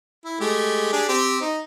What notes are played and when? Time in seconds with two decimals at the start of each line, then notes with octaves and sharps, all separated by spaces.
0.25 E4
0.40 G#3 A3 G4
0.93 D4 G4 G#4
1.08 C4 G4
1.41 D#4